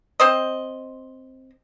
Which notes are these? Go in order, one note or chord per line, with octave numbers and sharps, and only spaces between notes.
C4 C5 D#5